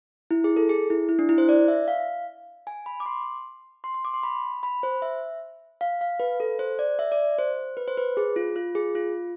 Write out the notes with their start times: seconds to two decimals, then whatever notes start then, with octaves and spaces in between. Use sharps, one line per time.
0.31 E4
0.44 G#4
0.57 A4
0.69 G#4
0.90 E4
1.09 E4
1.19 D4
1.29 E4
1.38 C5
1.49 D5
1.68 E5
1.88 F5
2.67 G#5
2.86 B5
3.00 D6
3.06 C6
3.84 C6
3.95 C6
4.05 D6
4.14 C6
4.23 B5
4.63 B5
4.83 C5
5.02 E5
5.81 F5
6.01 F5
6.20 B4
6.40 A4
6.59 C5
6.79 D5
6.99 E5
7.12 D5
7.39 C5
7.77 B4
7.88 C5
7.97 B4
8.17 G#4
8.36 F4
8.56 F4
8.75 G#4
8.95 F4